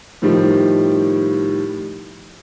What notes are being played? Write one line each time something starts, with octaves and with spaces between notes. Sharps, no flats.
A2 D#3 F3 G3